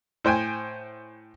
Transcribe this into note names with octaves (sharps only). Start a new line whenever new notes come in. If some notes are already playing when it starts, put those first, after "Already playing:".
A2 C5 G5 G#5